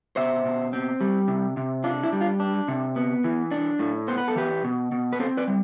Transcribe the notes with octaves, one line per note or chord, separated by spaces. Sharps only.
B2 C5 E5
B2
C4
G3
C3
C3
D4 F4
E4
G3
F4
D4
C3
B3
E3
D4
A2
B3 C5
B4
A4
E3 G4 B4
B2
B2
B4
C4 A4 C5
B4 D5
G3